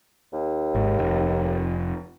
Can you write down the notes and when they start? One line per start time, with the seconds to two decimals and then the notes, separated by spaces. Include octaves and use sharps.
0.33 D#2
0.75 G#1 G#2
0.99 F1